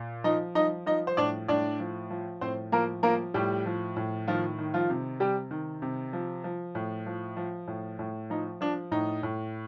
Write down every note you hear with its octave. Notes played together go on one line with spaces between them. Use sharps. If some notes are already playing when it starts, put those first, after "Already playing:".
Already playing: A#2
F3 D#4 D#5
F3 D#4 D#5
F3 D#4 D#5
C5
A2 D4 D5
A2 D4 D5
F3
F3
A2 C4 C5
F3 A#3 A#4
F3 A#3 A#4
A2 G3 G4
F3
A2
D#3 F3 F4
D#3
F3 F4
C3
C3 G3 G4
D#3
C3
F3
F3
A2
F3
F3
A2
A2
F3 D#4
F3 D4
A2 D#4
A2